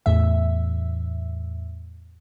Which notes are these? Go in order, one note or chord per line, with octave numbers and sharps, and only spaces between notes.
E2 A2 E5